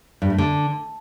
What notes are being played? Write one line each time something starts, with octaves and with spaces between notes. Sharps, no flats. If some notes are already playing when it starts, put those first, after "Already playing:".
G2
A3
D3